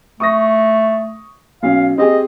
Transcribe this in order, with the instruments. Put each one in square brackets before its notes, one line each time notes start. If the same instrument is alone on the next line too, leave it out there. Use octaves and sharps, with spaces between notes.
[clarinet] A3 [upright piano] C#6 D#6 A#6
[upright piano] B1 C#4 [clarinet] F5
[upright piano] C4 G4 G#4 [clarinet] D#5